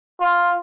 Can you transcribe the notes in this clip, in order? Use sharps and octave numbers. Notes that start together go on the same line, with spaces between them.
F4